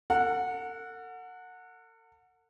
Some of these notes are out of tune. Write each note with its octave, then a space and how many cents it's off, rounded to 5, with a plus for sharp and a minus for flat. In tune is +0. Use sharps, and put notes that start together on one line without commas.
A4 +45 F#5 -15